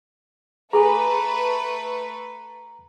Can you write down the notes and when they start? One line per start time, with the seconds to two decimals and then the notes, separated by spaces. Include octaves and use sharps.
0.73 A3 G#4 A4 B4 G#5 A#5